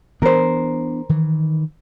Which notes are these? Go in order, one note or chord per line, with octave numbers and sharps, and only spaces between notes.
E3 B3 D4 A#4 C5
D#3 E3